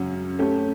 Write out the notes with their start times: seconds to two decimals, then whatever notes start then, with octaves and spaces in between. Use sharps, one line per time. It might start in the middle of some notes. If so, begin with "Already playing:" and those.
Already playing: F#2 C#3 F#3 C#4
0.39 A3 C#4 G4